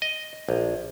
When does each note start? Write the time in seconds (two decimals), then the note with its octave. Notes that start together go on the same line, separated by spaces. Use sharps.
0.02 D#5
0.49 A#1